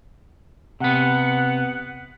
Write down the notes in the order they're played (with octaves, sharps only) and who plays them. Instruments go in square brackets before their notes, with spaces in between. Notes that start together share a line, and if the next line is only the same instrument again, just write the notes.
[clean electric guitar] C3 B3 [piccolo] F#5